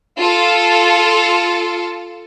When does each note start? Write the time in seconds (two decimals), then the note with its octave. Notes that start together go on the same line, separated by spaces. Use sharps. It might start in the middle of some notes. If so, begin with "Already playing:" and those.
0.18 F4 A4